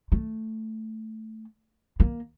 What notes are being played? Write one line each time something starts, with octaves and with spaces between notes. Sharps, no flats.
A3
A#3